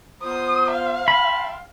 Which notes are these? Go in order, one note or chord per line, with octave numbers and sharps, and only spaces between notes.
B3 F4 C5 D#6
F5
G5 A5 B5 C6